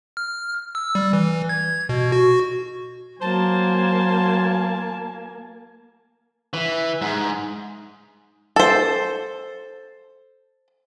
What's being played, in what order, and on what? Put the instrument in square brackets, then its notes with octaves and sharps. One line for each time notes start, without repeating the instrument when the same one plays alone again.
[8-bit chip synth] F6
E6
G3
E3
G#6
B2
F#4
[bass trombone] F#3 [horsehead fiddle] A#3 G#5 [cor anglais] C5 [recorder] A5
[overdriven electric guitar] E3
G#2
[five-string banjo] A4 C5